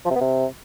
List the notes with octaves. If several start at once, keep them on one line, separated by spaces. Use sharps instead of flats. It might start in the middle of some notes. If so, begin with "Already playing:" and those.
F3
C3
B3
C3